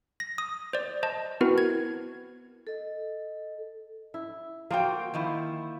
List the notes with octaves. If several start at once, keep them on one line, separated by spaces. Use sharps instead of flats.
A#6
D#6
C5 D5
C5 D#5 A5
B3 C4 E4 F#4 A#4 B4
G#6
A4 D#5
E4
F3 A#3 F#4 C5 G5
D#3 F3 E4